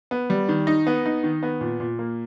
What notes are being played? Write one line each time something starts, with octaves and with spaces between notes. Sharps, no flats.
B3
G3
D#3
D#4
B3
D#4
D#3
B3
A#2
A#2
A#3